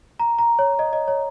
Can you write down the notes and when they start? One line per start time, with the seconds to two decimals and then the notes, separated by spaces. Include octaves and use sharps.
0.19 A#5
0.39 A#5
0.59 C#5
0.79 D#5
0.93 D#5
1.08 C#5